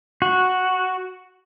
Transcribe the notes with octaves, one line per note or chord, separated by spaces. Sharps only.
F#4